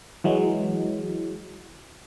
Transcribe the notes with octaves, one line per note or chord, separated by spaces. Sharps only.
E3 F#3 G#3